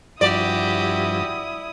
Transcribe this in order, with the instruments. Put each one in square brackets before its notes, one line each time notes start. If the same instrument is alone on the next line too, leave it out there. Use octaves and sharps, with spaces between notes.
[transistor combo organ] G2 F3 [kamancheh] E4 D#6 [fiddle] F#4 G4 [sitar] D5